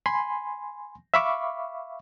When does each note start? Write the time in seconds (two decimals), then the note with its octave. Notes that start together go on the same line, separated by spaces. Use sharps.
0.06 G#5 B5 C6
1.14 E5 F5 B5 C#6 D6